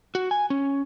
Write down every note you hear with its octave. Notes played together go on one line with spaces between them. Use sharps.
F#4
G#5
C#4